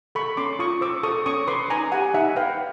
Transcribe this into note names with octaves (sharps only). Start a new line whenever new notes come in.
A4 B5 C#6
C#4 C6 D6
F4 C#6 D#6
C5 D6 E6
A4 C#6 D#6
C#4 C#6 D#6
B4 C6 D6
D#4 G#5 A#5
G4 F#5 G#5
D#4 E5 F#5
B4 F5 G5